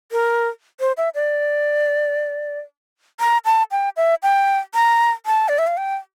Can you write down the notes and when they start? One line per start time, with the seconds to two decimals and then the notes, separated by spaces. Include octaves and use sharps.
0.12 A#4
0.80 C5
0.97 E5
1.15 D5
3.20 A#5
3.45 A5
3.71 G5
3.97 E5
4.23 G5
4.75 A#5
5.26 A5
5.48 D5
5.58 E5
5.67 F5
5.77 G5